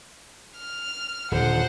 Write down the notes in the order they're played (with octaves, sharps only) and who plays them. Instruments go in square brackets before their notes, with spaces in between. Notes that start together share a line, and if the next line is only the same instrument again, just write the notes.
[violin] F6
[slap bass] D#1 D3 [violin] C5 F#5